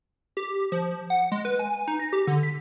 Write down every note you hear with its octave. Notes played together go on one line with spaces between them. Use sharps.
G4
F3
F#5
G#3
B4
G#5
D#4
A#6
G4
D3
B6